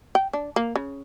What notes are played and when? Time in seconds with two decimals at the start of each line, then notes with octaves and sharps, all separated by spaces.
0.15 G5
0.33 D4
0.56 A#3
0.76 C#3